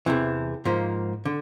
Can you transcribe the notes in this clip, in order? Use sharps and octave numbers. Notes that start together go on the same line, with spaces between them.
E2 C3 E3
G#2 F3 A#3
D3